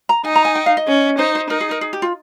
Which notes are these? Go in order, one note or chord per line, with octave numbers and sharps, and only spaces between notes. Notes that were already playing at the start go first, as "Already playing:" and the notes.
A#5
D#4 G#5
A#5
G#5
G5
F5
D#5
C#4
D#4 C5
C5
D#4 A#4
G#4
A#4
G#4
G4
F4